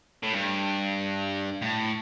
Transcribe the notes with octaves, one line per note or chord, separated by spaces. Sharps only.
A2
G2
A2